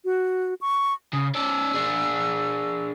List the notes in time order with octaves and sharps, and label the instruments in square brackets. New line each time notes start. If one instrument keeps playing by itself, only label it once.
[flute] F#4
C#6
[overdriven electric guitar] C#3 [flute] D#6
[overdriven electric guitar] C#4 D5 [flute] E6
[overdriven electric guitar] D4 G#4